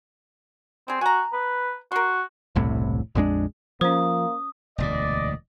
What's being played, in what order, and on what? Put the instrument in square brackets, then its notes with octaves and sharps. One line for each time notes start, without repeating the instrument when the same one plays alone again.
[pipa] G3 G#4 [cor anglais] C4
[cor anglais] F#4 [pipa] G#5 A#5
[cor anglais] B4
[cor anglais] F#4 [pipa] A#4 C6
[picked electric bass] E1 C2 A2 C3
A#1 F2 G#3 D4
[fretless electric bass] F3 [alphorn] A#3 [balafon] C#4 C5 [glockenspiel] D#6
[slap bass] E1 D2 A#2 [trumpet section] D5 D#5